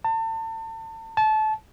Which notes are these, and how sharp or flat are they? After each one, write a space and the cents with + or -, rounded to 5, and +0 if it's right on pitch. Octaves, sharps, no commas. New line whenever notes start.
A5 +35
A5 -25